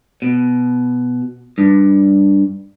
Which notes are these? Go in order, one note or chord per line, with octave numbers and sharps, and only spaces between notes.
B2
G2